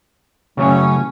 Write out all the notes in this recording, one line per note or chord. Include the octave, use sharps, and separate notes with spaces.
C#3 F#3 A3 C#4 C#5